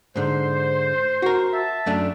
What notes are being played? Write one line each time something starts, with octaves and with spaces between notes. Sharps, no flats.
G#2 D3 C5
F#4 A#4
E5 A5
F#2 A3 D4